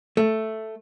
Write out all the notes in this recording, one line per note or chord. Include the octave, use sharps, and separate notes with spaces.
A3